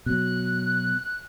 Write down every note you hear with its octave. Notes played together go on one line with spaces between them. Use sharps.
B2 F#3 F#6